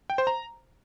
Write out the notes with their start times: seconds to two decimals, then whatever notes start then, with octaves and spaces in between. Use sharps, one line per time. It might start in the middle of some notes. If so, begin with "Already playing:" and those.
0.10 G5
0.18 C5
0.27 A#5